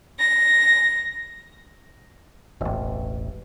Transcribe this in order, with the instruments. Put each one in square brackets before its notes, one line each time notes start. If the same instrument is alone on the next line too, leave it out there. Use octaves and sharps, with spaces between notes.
[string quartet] A#6
[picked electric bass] E1 A1